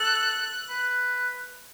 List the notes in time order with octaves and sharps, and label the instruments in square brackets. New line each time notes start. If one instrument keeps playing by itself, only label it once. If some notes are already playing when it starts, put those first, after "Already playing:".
Already playing: [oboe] A4 [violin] F#6
[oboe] B4